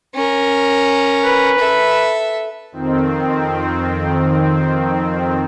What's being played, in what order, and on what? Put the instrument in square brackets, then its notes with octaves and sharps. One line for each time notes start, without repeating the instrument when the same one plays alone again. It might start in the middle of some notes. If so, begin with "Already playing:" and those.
[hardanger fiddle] C#4 A#4
[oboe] B4
[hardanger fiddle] A4 E5
[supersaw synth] F2 D#3 C4